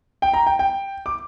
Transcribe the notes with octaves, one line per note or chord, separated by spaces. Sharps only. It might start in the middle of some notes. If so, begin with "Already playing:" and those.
G5
A#5
G5
G5
D6